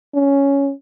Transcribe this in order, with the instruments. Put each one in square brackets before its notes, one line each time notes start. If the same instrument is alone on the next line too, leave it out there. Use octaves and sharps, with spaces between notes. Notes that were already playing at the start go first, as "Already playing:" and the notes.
[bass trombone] C#4